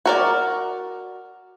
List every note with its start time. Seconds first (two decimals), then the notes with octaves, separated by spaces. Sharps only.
0.06 F#4 A#4 D5